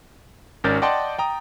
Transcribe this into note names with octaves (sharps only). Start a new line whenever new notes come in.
G#1 C#4 A#4 D5 G6 A6
D5 D#5 F#5 G5 A5 C6
G5 A#5 D#6